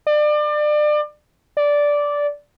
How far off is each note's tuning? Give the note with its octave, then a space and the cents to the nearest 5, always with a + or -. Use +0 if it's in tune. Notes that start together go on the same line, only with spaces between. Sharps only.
D5 +30
D5 -10